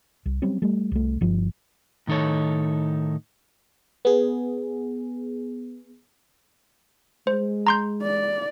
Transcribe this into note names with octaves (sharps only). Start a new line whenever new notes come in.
C2
F#3 G3 C4 C#4
G3 A3
C2 A3
G1 F3
A2 D#3 D#4 A4 C#5
B3 G#4
G#3 C5
A#5 C6 G6
D5